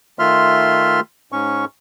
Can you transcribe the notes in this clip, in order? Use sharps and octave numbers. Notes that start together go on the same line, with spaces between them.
D#3 A3 F4 E5 C6 F6
G#2 C#4 C#6